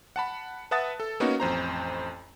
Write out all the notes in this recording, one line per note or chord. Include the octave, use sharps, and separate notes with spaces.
F#5 A5 B5
B4 E5 F#5 A5 D#6 A6
A4
A#3 B3 C#4 D#4 F#4
A1 F2 C5 A#5